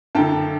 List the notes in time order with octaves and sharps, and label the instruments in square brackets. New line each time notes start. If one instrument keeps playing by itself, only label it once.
[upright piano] F#2 D3 G5 A5